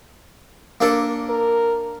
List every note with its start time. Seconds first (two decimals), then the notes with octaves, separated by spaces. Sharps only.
0.81 A#3 D4 A4
1.29 A#4